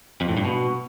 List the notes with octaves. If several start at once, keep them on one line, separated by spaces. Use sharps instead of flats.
F2
A2
G2
B2